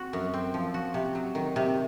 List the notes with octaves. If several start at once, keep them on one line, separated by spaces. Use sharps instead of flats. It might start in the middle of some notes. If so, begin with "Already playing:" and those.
Already playing: C4 F#4
F#2
C4
F3
F#4
C3
F#3
D#3
C3